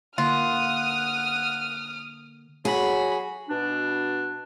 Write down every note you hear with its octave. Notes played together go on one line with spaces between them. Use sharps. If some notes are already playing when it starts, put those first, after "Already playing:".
D3 A#3 F4 F#5 D#6 F6
F#3 F#4 G#4 B5
B2 D4